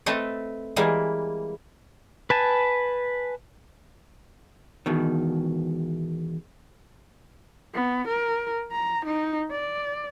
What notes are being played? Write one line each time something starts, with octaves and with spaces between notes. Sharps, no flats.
A3 C4 A4 B4 D#5
E3 G3 G#3 A#3 E4
B4 G#5 A5
E2 B2 D#3
B3
A#4
A#5
D#4
D5